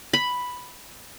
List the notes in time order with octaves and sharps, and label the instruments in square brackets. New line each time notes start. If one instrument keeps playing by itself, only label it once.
[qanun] B5